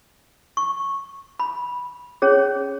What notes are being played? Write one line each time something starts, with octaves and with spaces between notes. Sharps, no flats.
C#6
B5
C#4 G#4 C#5